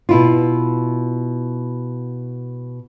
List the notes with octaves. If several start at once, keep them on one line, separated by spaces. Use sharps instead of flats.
B2 E4 F4